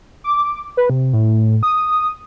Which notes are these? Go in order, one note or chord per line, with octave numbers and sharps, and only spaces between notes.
D6
B4
C3
A2
D#6